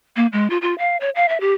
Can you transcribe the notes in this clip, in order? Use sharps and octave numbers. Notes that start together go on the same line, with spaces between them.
A#3
G#3
F4
F4
F5
C#5
F5
E5
G4